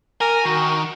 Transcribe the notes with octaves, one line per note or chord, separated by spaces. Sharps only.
A#4 G#5
D#3 F#4